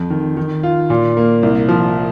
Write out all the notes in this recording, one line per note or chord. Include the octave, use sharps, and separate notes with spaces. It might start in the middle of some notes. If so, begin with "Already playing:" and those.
Already playing: F2
D#3
D#3
F4
A#2
A#3
C2
F3